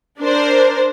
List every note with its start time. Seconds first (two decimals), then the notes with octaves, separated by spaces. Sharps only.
0.20 D4 A#4 C5